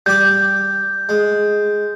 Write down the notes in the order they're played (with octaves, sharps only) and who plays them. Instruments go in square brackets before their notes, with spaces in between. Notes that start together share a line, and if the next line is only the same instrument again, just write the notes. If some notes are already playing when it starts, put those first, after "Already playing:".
[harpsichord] G3 G4 D6 [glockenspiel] G6
[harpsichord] G#3